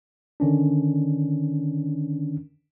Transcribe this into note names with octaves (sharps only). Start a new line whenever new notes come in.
D3 D#3 C#4 D4